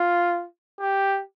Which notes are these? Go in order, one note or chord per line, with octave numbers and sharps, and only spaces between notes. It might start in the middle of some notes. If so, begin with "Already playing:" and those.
Already playing: F4
G4